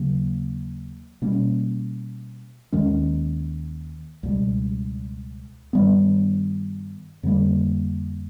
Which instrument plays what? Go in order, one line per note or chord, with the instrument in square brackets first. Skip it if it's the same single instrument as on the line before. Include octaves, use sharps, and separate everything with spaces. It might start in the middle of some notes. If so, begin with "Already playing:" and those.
Already playing: [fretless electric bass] D#2 C#3 F#3 A#3
B2 G3 A#3 C#4
D#2 D#3 G#3 C#4
C#2 B2 G3
G2 D#3 G3 B3
F2 D3 G3 A#3